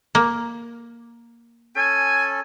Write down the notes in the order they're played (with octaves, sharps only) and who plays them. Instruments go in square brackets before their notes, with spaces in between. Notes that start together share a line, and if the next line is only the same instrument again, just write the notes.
[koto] A#3
[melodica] C#4 A4 [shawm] G#5